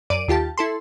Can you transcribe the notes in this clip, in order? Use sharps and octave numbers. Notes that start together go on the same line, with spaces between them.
F#2 D5 D7 D#7
D#2 F4 G4 A5
E4 A4 C6